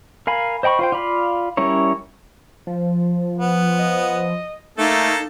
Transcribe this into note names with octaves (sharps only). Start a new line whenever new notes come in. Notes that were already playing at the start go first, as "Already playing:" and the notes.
A#4 F5 G#5 B5
C5 D#5 G5 B5 C#6
F4 C5 G5
F4 D5 F5 B5
G3 C#4 E4 A#4 C#5
F3
B3
D#5
A3 A#3 D#4 A4